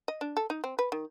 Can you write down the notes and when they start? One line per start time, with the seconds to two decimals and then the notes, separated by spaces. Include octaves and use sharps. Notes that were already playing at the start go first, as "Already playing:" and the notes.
0.08 D#5
0.21 D4
0.37 A4
0.50 D#4
0.64 C4
0.79 B4
0.92 D#3